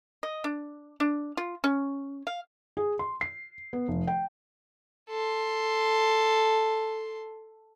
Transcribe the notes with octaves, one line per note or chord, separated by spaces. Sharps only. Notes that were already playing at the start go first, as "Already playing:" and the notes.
D#5
D4
D4
F4
C#4
F5
G#4
C6
C7
B3
F1
G5
A4 C6